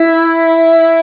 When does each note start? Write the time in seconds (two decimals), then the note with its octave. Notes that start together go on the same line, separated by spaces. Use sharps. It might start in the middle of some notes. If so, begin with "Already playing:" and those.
Already playing: E4